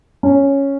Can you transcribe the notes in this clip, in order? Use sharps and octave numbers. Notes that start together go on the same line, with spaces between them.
C#4